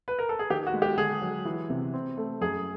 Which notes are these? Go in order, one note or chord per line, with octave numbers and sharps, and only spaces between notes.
B4
A#4
A4
G#4
D#3 G4
F#4
G#3
G4
D3 G#4
F#3
E3
C3
C4
A3
F#2 G#4